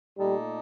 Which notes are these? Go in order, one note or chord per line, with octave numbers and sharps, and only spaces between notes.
A#2 G3 A3 D#4 A4 D5